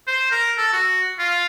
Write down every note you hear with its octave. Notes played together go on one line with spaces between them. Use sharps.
C5
A#4
A4
F#4
F4